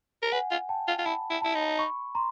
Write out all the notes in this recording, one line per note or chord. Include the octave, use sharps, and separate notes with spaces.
A#4
B4 F#5 G#5
F4
G5 A5
F4
F4
E4 A5 B5
E4
E4 A5 B5
D#4
B5 C#6
A#5 C6